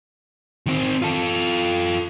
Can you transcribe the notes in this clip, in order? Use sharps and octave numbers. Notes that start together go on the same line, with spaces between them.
D#3 C4
F4 A4